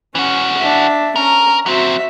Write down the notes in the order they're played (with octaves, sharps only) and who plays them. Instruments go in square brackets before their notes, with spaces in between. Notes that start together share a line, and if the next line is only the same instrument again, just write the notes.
[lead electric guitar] E3 F#4 [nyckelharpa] C#4
[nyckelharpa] D4 E5
[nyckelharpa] C#4 A#5 [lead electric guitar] A#4
[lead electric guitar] F#3 C4 [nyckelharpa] F#4 E5